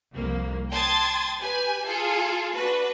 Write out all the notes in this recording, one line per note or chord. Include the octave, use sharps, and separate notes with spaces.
C2 F2 A#3
G5 A5 C6 D#6 G#6 A6
G4 B4 G#5
F4 G#4 A4
D4 F#4 B4